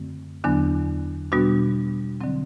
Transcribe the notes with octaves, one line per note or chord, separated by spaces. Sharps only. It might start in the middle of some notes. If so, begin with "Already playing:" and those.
Already playing: F#2 D3 A3 C4
E2 D3 F#3 B3 D4
B2 G3 B3 D4 F#4
D3 F#3 C4